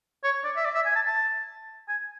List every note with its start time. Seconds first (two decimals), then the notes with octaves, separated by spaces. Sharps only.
0.23 C#5
0.44 D5
0.57 E5
0.65 D5
0.75 E5
0.85 G#5
0.95 A5
1.06 A5
1.88 G#5